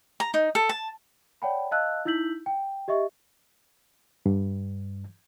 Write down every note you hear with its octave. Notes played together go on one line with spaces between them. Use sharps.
A#5
D#4
A4
A5
C#5 D5 F#5 G5 A5 B5
D#5 F5 A5 E6 F#6
D#4 E4 E6 G6 B6 F#7
G5
G4 D#5 E5 C#6
G2